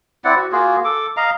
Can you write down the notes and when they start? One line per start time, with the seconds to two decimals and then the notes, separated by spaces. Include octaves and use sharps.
0.24 C4 E4 D5 F#5
0.36 F#4
0.52 A#3 F4 F#4 G#4
0.85 A4 D6
1.17 D#5 F5 A#5